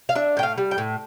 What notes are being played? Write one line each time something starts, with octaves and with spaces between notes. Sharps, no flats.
F5
D4 E5
A2 G5
F5
G3
G5
A2